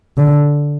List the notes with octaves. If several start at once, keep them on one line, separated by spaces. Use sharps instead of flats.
D3